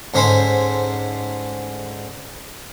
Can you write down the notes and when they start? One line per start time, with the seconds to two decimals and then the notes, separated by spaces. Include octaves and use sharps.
0.14 G#2 D3 C#4 C5 B5